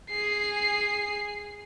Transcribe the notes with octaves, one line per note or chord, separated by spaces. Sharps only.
G#4 C7